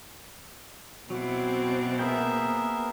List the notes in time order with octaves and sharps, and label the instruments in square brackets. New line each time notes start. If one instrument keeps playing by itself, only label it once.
[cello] B2 C4 [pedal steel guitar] F#3 E4 [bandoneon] F#5 D6
[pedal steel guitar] A#3 G5 [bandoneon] B3 G#4 A#4 [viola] E5